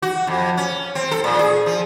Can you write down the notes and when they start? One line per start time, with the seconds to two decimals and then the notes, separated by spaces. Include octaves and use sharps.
0.02 F#4
0.27 F2
0.57 C#4
0.95 C4
1.11 A4
1.24 A#2
1.39 G#4
1.66 F3